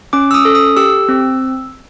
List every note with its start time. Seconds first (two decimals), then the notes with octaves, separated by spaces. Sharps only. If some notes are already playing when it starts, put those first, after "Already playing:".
0.13 C#4 D6
0.31 E6
0.34 D#6
0.45 A4
0.55 D#6
0.77 G4 E6
1.09 C4